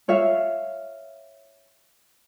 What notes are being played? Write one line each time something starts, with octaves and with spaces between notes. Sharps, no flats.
F4 C#5 E5 F5